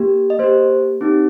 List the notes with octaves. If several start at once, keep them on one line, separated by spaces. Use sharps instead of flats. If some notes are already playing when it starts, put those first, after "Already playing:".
Already playing: A#3 G4
D#5
A#3 G4 C5
C4 D#4 G4